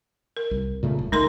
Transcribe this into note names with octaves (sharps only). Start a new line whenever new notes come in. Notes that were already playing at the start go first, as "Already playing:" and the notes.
A#4
C2
A#2 C#3 A3
D#1
C#2 G#3 A3 D#4 A#4 C6